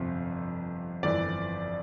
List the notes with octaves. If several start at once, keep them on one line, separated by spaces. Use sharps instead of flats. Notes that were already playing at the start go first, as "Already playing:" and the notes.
Already playing: G1 F2 C3
G1 F2 E3 D5